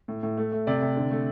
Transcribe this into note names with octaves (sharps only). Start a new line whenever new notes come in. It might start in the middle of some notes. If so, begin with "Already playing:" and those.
A2
A2
A3
A3
C3 D5
C3
D3
A3